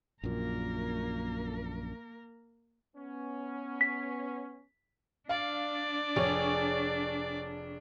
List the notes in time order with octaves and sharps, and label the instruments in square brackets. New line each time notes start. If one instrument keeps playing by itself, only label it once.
[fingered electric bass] A#1 F#2 A#2 [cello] A#3 A#4
[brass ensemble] B3 C#4
[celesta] B6
[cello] D4 [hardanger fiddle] D5 [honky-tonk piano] F5
[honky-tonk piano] F1 C#5 [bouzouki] G#4